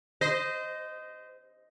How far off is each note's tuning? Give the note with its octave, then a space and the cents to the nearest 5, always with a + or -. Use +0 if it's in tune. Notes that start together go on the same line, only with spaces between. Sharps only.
C5 -25 D#5 +0